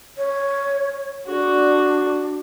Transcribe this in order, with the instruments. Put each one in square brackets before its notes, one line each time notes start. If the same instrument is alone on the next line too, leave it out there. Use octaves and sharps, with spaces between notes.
[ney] C#5
[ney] D4 [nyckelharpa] F#4